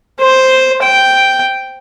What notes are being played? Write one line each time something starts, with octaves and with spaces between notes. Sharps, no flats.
C5
G5